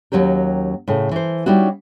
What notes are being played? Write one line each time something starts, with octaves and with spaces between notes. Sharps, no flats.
D#2 F#3 C#4 G4 A#4
A2 C#3
E3 C5
G3 C#4 D#4 E4 F#4